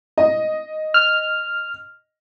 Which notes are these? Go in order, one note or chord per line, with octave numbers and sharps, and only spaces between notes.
D#5
F6